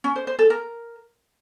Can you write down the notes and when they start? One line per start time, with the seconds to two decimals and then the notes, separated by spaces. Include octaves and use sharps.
0.04 C#4
0.16 C5
0.27 C5
0.39 A4
0.50 A#4